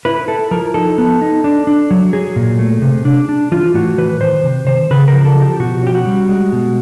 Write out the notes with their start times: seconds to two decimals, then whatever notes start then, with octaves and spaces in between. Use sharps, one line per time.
0.05 E4 B4
0.28 E4 A4
0.51 F3 A#4
0.74 D#4 A4
0.98 B3
1.22 D#4
1.44 D4
1.67 D4
1.91 F#3
2.13 F#3 G#4
2.36 A#2
2.59 A3
2.82 C3
3.05 D4
3.29 D4
3.52 E3 F4
3.74 A2 F#4
3.98 E3 B4
4.20 D#3 C5
4.44 C3
4.67 D#3 C5
4.91 C#3 B4
5.08 A#4
5.13 F3
5.25 A4
5.37 F3 G4
5.60 B2 F#4
5.83 C#4 G4
5.95 F#4
6.06 G3
6.29 G#3
6.53 B2